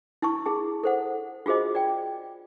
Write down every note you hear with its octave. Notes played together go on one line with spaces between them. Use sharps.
E4 A5 C#6
E4 G#4 A5
A4 C5 F#5
F4 F#4 G#4 C5 D#5
D5 G5